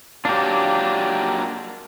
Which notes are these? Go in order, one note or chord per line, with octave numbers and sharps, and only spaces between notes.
F#3 A#3 D4 F4 G4